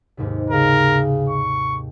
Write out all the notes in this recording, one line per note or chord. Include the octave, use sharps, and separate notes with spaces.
D#2 G#2 C3
C#3 A#4
C#6